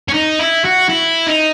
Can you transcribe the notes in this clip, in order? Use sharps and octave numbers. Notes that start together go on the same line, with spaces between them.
C#4
D#4
E4
F#4
E4
D#4